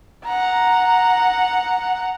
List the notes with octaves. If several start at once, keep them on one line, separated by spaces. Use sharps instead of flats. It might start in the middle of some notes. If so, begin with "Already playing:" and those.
F#5 A#5